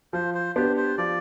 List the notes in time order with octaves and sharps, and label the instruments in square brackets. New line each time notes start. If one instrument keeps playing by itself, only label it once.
[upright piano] F3 [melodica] C5
[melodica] C5
[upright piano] B3 D4 G4 [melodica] C5
[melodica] C5
[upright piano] F3 [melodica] D5